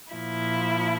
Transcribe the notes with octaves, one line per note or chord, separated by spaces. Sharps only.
A#2 F3 E4